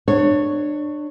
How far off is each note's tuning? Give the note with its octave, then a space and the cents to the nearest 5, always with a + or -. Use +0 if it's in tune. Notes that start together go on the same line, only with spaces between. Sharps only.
D4 +25 C#5 +0